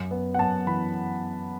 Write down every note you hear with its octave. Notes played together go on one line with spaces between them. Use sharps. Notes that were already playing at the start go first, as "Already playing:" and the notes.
Already playing: F#2
B3
F#5
F#2 A5
E3 B5